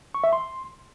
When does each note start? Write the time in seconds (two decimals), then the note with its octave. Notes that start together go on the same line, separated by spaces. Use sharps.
0.14 C#6
0.24 E5
0.33 C6